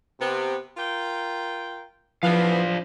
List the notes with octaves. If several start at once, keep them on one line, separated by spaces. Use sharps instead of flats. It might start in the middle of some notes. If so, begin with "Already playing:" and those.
C3 B3
F4 A#4 G5
E3 F3 B3 D4 F5